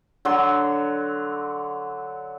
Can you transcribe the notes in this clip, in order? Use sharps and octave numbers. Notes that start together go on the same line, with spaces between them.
D3 F#3 C6